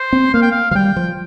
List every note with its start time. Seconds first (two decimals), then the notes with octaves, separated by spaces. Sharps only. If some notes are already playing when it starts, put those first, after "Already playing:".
Already playing: C5
0.13 C4
0.34 A#3 F5
0.42 G5
0.51 F5
0.71 F3 F5
0.75 G3 G5
0.96 F3